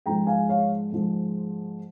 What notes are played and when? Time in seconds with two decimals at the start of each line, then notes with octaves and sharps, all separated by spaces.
0.06 G#2 F3 G#3 G5 A#5
0.27 F5 G#5
0.49 C#5 F5
0.92 G#2 F3 G#3